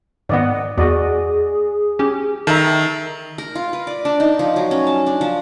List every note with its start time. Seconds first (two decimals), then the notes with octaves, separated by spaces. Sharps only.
0.29 G#2 D#3 B3 D5 D#5 F#5
0.78 E2 F#4 G#4 D5 D#5
1.99 C#4 G4
2.47 D#3 A4 E5 A5 A#5
3.38 A#4
3.55 F4
3.73 B4
3.87 D5
4.05 D4
4.20 D#4
4.39 F3
4.56 F#3
4.71 C#4
4.87 A5
5.07 D4
5.21 F3